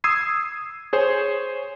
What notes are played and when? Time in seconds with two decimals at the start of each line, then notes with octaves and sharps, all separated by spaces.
0.04 D#6 E6 G#6 C7 D#7
0.93 G#4 C5 C#5 G#5